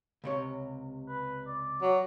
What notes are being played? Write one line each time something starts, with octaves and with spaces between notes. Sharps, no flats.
C#2 C3 C#5
B4
D5
F#3